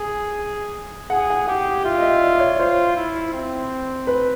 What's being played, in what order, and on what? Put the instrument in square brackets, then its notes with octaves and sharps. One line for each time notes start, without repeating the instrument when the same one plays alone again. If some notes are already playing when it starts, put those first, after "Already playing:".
Already playing: [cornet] G#4
[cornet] G#4 [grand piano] F#5
[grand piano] F#5
[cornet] G4 [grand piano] F#5
[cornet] F4 [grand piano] E5
[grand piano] D#5
E5
D5
D5
C#5
[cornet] F4 [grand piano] C5
[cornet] E4
C4
[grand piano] B4